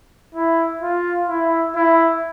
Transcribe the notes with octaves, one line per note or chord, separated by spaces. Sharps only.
E4
F4
E4
E4